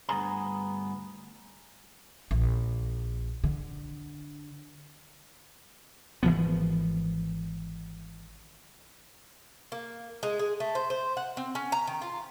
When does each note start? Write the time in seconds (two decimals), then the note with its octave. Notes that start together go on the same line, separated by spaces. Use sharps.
0.09 D2 G2 B3 G#4 A#5
2.31 A#1
3.44 D3
6.23 G#1 E3 F3 B3
9.72 A#3
10.23 G#3
10.39 G#4
10.60 A3
10.75 C5
10.90 C5
11.17 F#5
11.37 C4
11.55 C#4
11.72 A#5
11.87 D#3
12.02 F4